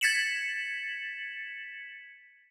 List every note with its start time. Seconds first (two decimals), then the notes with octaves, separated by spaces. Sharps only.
0.01 G#6 A6 B6 C#7 E7 F#7